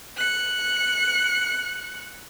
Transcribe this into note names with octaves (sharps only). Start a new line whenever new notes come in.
F#6 C#7